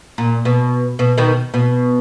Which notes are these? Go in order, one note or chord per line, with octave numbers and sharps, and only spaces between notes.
A#2
B2
B2
B2 D#3
B2